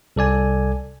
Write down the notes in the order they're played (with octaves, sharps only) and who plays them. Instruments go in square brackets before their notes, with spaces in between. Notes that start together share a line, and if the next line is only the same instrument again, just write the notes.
[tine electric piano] C2 A4 D5 G#5